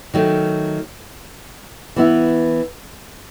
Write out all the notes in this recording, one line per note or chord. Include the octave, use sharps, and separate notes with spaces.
D#3 F#3 A3
E3 B3 E4